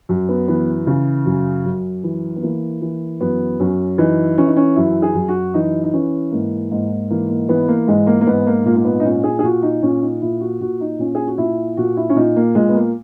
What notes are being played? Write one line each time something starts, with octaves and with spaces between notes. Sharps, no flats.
F#2
B3
E3 B3
C#3
F#2
F#2
E3
B3
E3 A#3
E3
F#2 B3
F#2 C#4
E3 D#4
E3 C#4
D#4
C#4
F#2 E4
G#4
F#2
F#4
E3 D#4
D#4
E3 C#4
G#2 A#3
G#2 A#3
E3 A#3
A#3
E3 B3
A#3
G#2 G#3
A#3
A#3
G#2 B3
A#3
A#2 A#3
A#3
B3
D#4
A#2 C#4
G#4
G#4
A#2 F#4
D#4
A#2 C#4
D#4
A#2 E4
F#4
A#2 F#4
D#4
A#2 C#4
G#4
F#4
A#2 E4
A#2 F#4
E4
C#4
A#2 D#4
A#3
A#2 G#3
B3
A#3